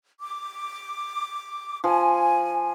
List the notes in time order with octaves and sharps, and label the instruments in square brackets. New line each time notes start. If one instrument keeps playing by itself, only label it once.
[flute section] D6
[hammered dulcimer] F3 [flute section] G#5